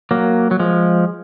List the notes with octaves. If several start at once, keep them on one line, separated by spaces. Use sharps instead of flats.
F#3 A#3
F#3
F3 G#3